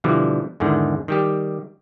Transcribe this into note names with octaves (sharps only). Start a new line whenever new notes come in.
B2 D3 E3 F3 G3
E2 G#2 D3 D#3
D#3 G3 G4